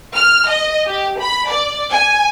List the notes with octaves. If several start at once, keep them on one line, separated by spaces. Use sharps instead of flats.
F6
D#5
G4
B5
D5
G#5